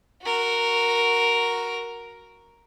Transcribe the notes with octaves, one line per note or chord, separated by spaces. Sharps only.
F#4 A#4